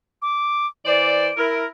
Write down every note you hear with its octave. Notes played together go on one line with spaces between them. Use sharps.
D6
E3 C5 D5 D7
E4 A#4